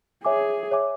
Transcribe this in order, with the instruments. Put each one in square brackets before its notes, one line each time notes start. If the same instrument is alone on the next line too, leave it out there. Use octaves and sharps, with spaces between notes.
[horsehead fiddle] G#4 [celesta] C#5 E5 G#5 D6
[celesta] C#5 E5 G#5 D6